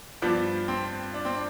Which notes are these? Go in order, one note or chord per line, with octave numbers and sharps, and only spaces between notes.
G2 F3 B3 D4
C4
D4
C4
D4